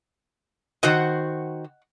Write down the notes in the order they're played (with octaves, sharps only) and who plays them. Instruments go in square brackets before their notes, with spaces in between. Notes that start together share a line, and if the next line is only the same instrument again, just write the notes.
[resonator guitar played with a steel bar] D#3 F#4 C5 [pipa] D#5 F#5